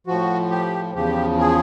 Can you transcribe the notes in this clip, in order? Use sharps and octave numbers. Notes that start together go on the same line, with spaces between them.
A2 F3 F#4
G4
E2 C#3 F3 G4
G#4